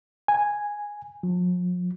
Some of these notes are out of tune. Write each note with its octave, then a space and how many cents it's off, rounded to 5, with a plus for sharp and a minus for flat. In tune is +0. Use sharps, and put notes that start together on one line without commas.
G#5 -5
F3 +45